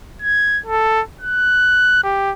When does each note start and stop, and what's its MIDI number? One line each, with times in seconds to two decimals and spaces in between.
0.22 0.60 92
0.66 1.02 69
1.21 2.02 90
2.03 2.33 67